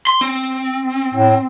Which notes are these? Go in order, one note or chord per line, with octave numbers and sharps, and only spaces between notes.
C6
C4
A2